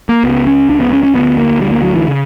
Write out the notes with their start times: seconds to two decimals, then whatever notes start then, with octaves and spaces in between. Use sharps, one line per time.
0.09 A#3
0.23 C#2 C#3 B3
0.47 C#4
0.69 C#2 C#3 D4
0.81 B3
0.93 C#4
1.03 C#4
1.15 D2 D3 B3
1.38 A#3
1.60 D2 D3 G3
1.71 A#3
1.82 F#3
1.95 E3
2.08 C#3